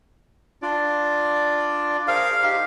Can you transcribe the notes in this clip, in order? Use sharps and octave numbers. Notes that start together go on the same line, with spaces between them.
D4 F4 D5
G#4 A#4 C5 F5
D#4 G4